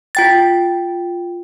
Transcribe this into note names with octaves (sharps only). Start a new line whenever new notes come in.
F4 G5 A6